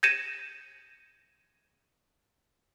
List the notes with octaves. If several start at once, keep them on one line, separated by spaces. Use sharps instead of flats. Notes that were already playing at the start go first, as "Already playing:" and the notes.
G6 G#6 A#6 C#7 D#7 E7